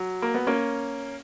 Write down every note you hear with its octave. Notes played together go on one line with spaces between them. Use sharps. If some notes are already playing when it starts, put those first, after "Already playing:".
Already playing: F#3
A#3
B3
A#3 C#4